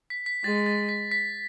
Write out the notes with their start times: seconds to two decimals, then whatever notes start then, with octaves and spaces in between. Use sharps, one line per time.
0.10 B6
0.26 B6
0.44 G#3 A6
0.66 A6
0.89 B6
1.11 B6